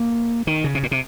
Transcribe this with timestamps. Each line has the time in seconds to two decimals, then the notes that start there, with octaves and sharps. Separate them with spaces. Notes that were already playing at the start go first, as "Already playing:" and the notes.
Already playing: A#3
0.47 D#3
0.64 C#3
0.75 C3
0.83 A#2
0.91 C3